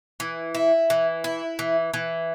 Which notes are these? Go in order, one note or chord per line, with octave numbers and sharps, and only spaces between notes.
E3
E4
E3
E4
E3
E3